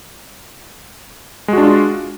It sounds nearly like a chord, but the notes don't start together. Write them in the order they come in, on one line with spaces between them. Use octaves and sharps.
G#3 F#4 D4 F4